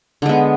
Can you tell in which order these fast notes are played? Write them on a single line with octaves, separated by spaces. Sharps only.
D3 G#3 B3